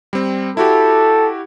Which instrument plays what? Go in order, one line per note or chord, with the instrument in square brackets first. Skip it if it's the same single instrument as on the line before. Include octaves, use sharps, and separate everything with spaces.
[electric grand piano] G3 C4
[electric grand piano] E4 F#4 G4 [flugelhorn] A4